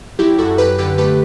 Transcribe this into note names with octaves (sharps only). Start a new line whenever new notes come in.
F#3 E4 G4
F#2 F#4 A4
F#3 G4 B4
D3 G4 B4
A3 G4 B4